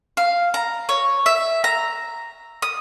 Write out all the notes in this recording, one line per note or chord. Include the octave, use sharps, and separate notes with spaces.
F5
A#5
C#5
E5
A#5
D#6